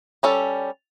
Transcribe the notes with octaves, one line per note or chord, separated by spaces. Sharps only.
G3 C#4 A4